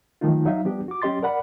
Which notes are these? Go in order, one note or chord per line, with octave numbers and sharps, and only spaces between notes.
D#3 F3 F#3 A3 D#4 F4
F#3 D#4 E5 F5
F3 G3 B3 D4 G4
F#4 D6
F#3 C#4 G4 D#5 C6 A6
A#4 D5 F#5 B5